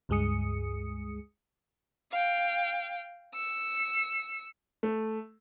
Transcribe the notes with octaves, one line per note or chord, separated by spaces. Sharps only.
C#2 G2 G#3 G#4 D#6 C#7
F5 G5
E6 C#7
A3